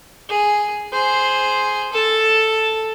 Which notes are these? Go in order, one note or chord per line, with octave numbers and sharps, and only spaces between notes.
G#4
G#4 C5
A4 A5